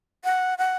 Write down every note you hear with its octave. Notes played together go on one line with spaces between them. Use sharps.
F#5
F#5